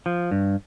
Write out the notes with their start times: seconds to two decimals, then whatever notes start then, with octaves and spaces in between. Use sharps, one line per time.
0.06 F3
0.31 G2